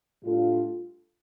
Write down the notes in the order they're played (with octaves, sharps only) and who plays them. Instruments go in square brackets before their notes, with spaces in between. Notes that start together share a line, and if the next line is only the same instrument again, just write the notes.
[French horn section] A2 G3 D4 F4 A4